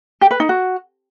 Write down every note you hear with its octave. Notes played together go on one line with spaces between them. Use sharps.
G4
B4
D#4
F#4